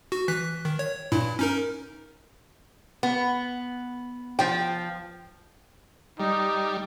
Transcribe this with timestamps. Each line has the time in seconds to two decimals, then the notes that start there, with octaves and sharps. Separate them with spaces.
0.12 F#4
0.28 E3 F#6 B6
0.65 D#3
0.79 C#5
1.12 G2 A#2 E4
1.39 C#4 D#4 A#4
3.03 B3
4.39 F3 G5
6.20 G3 D#4